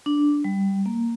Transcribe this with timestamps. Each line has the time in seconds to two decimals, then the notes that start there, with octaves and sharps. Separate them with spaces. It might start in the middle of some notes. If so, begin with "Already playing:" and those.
0.06 D4
0.44 G3
0.86 A#3